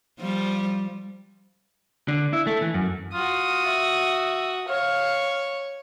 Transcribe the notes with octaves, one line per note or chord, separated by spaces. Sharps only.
F3 G3
D3
E4
A3
E3
F#2
F4 F#4 D#6
E5
C#5 F5